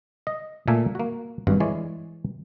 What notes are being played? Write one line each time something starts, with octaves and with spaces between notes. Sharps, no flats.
D#5
A#2 A3 A#3 A4 E5 G#5
A#3 F#4
G#1 G2 F#4
E3 G#3 C#5 D5